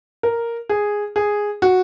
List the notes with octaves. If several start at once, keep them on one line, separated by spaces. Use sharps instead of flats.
A#4
G#4
G#4
F#4